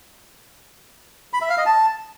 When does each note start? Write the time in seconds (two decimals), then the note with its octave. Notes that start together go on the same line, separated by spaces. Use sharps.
1.33 B5
1.41 E5
1.50 F5
1.58 D#5
1.66 A5